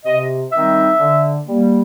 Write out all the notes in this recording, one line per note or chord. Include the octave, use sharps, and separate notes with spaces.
C3 D#5
D#3 G3 C4 D#4 E5
D3
G3 A#3